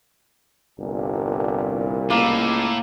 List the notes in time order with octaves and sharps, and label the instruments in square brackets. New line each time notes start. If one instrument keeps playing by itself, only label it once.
[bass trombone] G1 [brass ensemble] C2 A#2
[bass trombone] C#2 [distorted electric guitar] A2 [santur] A#3